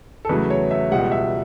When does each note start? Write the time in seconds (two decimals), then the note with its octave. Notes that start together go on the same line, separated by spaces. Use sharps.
0.25 A4
0.29 E2 C#3 F#3 A3 B4
0.50 C#5
0.71 E5
0.91 C#2 B2 G3 F#5
1.12 E5